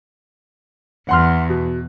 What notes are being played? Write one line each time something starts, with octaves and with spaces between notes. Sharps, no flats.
E2 F#5 C6 F6
B2